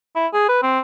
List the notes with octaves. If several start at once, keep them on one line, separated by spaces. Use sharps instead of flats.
E4
G#4
B4
C4